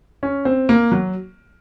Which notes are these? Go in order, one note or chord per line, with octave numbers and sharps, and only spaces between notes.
C#4
C4
A#3
F#3